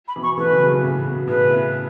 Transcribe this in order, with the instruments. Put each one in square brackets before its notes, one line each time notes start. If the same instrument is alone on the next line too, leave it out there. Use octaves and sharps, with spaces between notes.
[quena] B5
[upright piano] B2 E3
[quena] C#6
[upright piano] E3 A3 [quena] B4
[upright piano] C#3 F#3
C#3 F#3
B2 E3
A2 C#3
B2
[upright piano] A2 C#3 [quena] B4
[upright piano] B3 E4